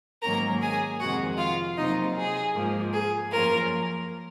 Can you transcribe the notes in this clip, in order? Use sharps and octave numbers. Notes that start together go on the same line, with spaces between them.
G#2 D#3 F#3 A#3 C#4 A#4 A#5
G#4 G#5
F2 C3 D#3 G#3 F#4 F#5
F4 F5
C3 F#3 A#3 D#4 F4 D#5
G#4
G#2 F3 A#3
G#4
F#2 F3 A#3 C#4 F4 A#4